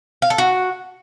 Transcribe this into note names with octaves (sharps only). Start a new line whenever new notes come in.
F5
A4
F#4